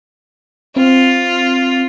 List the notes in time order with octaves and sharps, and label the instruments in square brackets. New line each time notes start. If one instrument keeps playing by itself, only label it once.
[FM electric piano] C4 [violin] F4